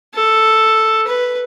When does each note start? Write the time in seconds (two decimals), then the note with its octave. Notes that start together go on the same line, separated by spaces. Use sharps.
0.15 A4
1.07 B4